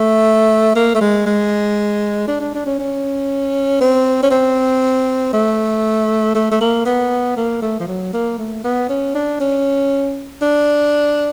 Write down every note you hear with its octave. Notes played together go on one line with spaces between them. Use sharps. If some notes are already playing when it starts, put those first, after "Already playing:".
Already playing: A3
A#3
A3
G#3
G#3
D4
D4
D4
C#4
C#4
C4
C#4
C4
A3
A3
A3
A#3
B3
A#3
A3
F3
F#3
A#3
A3
B3
C#4
D4
C#4
D4